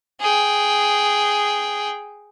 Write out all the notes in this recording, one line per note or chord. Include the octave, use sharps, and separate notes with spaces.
G#4 G5